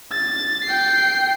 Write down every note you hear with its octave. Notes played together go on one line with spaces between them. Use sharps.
A6
G5 C7